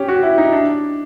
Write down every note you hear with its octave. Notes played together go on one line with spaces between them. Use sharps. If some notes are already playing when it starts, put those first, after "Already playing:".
Already playing: C#4 G4
F#4
E4
D#4
D4